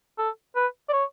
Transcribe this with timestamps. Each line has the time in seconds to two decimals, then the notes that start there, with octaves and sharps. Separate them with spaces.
0.18 A4
0.56 B4
0.89 D5
0.93 C#5